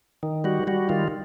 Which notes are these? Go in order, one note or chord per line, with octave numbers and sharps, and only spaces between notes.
D#3
G3 F#4
G3 F#4
D#3 F4